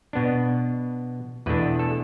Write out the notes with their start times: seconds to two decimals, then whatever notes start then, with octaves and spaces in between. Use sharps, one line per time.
0.13 B2 B3 D4
1.46 E2 B2 A3 D4 B4
1.79 A4